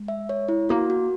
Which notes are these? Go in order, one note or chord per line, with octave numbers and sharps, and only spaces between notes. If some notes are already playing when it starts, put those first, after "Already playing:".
Already playing: G#3
E5
C#5
E4
A#3 F#4
F#4